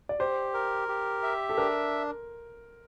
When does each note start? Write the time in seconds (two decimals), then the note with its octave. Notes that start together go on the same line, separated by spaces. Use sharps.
0.09 D5
0.19 G4 C5
0.54 A#4
0.88 G4
1.23 E5
1.49 A4
1.57 D4 A#4